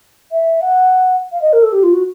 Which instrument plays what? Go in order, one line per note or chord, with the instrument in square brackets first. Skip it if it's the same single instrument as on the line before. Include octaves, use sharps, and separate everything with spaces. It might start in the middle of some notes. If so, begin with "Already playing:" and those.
[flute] E5
F#5
F5
D#5
A#4
A4
G4
F4
F#4